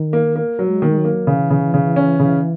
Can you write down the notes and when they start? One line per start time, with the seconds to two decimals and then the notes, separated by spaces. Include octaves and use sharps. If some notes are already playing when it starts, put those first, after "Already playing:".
Already playing: D#3
0.13 A#3
0.36 A#3
0.59 F#3
0.67 G#3
0.82 D#3 A#3
0.90 G#3
0.98 F#3
1.05 A#3
1.27 C#3 E3
1.50 C#3
1.74 C#3
1.96 C#4
2.19 C#3